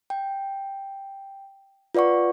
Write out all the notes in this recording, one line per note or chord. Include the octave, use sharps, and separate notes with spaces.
G5
F4 B4 D5 F#5 C#6